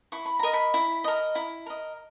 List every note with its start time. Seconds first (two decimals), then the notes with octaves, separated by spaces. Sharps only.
0.12 E4 C#6
0.25 B5
0.39 A#4 D#5 A#5
0.53 B5
0.74 E4
1.04 A#4 D#5
1.35 E4
1.66 A#4 D#5